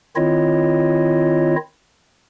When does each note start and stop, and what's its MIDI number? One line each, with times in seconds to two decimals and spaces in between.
0.16 1.56 51
0.16 1.56 60
0.16 1.56 64
0.16 1.56 65
0.16 1.56 73
0.16 1.56 75